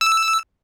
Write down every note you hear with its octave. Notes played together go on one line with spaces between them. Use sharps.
E6